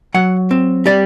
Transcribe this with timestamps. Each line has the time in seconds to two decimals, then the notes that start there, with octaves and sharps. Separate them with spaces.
0.14 F#3 F#5
0.51 C4
0.86 G3 D5